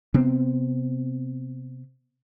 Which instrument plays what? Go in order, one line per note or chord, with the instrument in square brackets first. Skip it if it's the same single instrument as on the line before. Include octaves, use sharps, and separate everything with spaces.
[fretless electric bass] C3 B3 C4